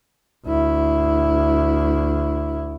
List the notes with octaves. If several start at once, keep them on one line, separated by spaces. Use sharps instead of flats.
D2 E4